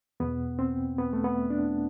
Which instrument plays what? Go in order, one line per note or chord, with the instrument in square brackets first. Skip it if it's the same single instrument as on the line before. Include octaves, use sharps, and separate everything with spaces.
[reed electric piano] E2 B2 B3
C4
B3
A3
B3
D4